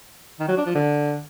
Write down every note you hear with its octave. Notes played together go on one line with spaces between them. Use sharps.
D#3
F#3
D4
F3
D3